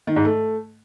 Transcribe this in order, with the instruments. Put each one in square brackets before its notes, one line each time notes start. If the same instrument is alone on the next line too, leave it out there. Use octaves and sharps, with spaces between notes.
[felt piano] D#3
G#2
A3